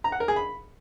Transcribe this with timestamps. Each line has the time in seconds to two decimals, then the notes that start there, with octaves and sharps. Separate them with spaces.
0.04 A#5
0.12 F#5
0.20 A#4
0.28 G#4
0.36 B5